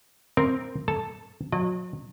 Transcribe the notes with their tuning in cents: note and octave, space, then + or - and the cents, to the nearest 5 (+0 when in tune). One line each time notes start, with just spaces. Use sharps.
C4 +0 A#4 +0
A4 +0 A5 +0
F#3 -35 D#5 -45